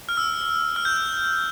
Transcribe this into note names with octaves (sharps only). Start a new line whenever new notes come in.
F6
E6
F6
G6